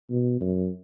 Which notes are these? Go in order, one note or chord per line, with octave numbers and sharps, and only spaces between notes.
B2
F#2